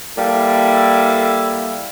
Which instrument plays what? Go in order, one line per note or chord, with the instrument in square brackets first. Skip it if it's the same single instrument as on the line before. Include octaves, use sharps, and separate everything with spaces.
[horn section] G3 A#3 E4 A4